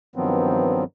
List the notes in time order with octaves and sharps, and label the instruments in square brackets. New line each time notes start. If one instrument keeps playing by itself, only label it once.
[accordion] G2 D#3 F3 F#3 B3 C4